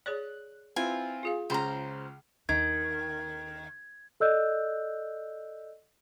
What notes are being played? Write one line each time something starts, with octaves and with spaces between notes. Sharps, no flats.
G#4 C#5 D5 F#6
C4 E4 F4 B4 G#5
F4 G#4 F5
C#2 C#3 C5 A#5 C6
D#2 D#3 G#6
A4 D5 D#5 E6 F#6 G6